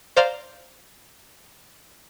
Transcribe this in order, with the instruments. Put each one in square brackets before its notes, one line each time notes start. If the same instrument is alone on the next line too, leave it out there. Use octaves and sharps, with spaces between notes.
[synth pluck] C5 D5 F5 A#5